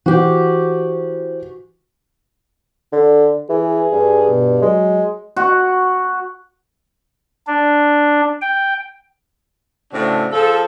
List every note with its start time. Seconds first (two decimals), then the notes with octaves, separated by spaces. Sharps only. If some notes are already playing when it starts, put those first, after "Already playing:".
0.06 E3 F#4 G4 C5
2.93 D3
3.49 E3 G#4
3.92 G2
4.29 B2
4.62 F#3 G#3
5.36 F#4
7.47 D4
8.41 G5
9.93 A2 C#3 C4 D4 F#4
10.32 F3 G#4 A4